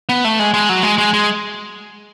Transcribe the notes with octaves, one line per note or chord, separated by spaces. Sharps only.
B3
A3
G#3
G#3
F#3
G#3
G#3
G#3